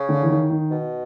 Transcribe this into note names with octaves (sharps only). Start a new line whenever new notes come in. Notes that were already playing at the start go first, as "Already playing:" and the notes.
Already playing: C#3
D3
E3
D#3
D#3
B2